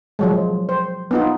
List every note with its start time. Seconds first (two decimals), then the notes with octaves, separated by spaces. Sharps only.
0.19 F3 F#3 G#3
0.69 C5
1.11 B3 D#4 F4